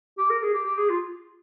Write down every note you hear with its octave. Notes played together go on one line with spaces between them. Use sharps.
G4
A#4
G#4
G4
G4
G#4
F4